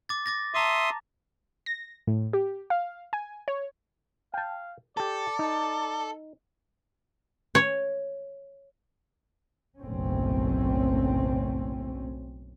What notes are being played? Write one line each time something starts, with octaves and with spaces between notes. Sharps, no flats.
D6 A6
D6 A6 A#6
E5 A5 A#5 C6 D6 D#6
A#6
A2
G4
F5
G#5
C#5
F5 G5 A5
G4 A4 D5 A5
D#4
C#5
F#1 B1 A2 A3 C4 C#4